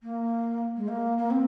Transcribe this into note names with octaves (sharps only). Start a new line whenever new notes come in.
A#3
G#3
A#3
A#3
C4